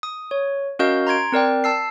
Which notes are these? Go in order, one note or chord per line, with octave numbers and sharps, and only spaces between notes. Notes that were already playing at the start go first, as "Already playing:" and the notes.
D#6
C#5
C#4 F#4 A#4 D#5 F5 G6
A#5 C6 G#6 D7
C4 A#4 D5 G5
A5 E6 C7